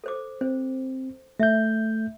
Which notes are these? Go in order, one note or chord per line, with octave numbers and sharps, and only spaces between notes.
A4 C5 D6
C4 C5
A3 E5 G6